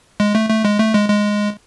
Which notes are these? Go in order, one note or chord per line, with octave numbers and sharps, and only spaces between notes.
G#3
A3
A3
G#3
A3
G#3
G#3